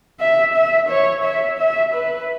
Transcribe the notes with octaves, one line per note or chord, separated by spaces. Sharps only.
E5
E5
C#5
E5
E5
B4